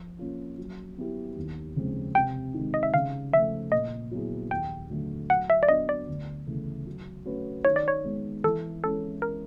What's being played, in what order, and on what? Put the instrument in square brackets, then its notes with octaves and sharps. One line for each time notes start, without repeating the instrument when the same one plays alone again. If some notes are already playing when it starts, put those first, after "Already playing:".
Already playing: [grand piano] F3
A#3 C#4 F4
F#3
B3 E4 G4
D#2
C#3 F3 G#3 C4
[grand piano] C3 [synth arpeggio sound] G5
[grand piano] D#3 G#3
[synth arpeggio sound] D#5
E5
[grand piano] C#3 [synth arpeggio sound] F5
[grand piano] F3 A3 [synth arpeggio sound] E5
[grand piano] A#2 [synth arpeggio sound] D#5
[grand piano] F#3 B3 E4 G#4
[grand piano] D#2 [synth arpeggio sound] G5
[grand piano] D3 F#3 A3
[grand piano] F#3 [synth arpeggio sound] F#5
[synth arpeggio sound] E5
D5
[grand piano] B3 D4 F#4 [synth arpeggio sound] D#5
[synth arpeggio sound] D5
[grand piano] D2
C#3 E3 A3
F#3
A3 C#4 F#4 B4
[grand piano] D#3 [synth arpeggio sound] C#5
[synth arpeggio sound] D5
C#5
[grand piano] G#3 B3
[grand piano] E3 [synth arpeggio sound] A4
[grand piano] G#3 C#4 E4 [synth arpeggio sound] A4
[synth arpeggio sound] A#4